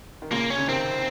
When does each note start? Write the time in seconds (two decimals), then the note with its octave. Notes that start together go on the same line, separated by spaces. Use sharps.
0.22 D#3
0.32 A#2 C#3 A#3
0.50 C#4
0.58 C#3
0.68 C3 D#3 C4